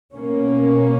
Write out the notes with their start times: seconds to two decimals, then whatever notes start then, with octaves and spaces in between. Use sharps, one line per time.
0.13 B2 A#3 C#4